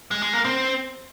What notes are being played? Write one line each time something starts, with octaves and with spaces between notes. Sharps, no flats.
G#3
G#3
A#3
C4